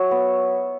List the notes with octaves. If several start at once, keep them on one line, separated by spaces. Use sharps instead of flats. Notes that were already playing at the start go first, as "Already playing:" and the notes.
Already playing: F#3 C#5 E5
B3